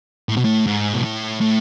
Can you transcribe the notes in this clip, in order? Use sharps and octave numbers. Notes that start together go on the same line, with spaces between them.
A2
B2
A2
G#2
B2
A2
A2